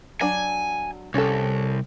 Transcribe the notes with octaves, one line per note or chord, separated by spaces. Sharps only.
F#3 D4 G#5
C2 C#4 A4